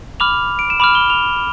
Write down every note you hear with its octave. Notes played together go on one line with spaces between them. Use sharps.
B5 D6 F6 F7
D7
E7
B5 D6 F6 F7
G7
F7